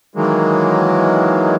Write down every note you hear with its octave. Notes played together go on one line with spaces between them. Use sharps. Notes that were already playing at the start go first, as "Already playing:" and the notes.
D#3 E3 F#3 G#3 A#3